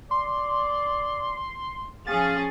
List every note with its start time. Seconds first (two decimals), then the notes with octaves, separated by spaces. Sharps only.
0.11 D5 C6
2.07 F3 C#4 G#4 F5 A6